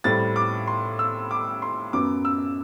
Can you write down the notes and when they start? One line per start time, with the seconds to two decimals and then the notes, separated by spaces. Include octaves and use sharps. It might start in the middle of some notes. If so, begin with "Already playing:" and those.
0.04 A2 G3 C4 A6
0.36 D6
0.67 C6
0.99 E6
1.31 D6
1.62 C6
1.93 F#2 F#3 B3 D6
2.25 E6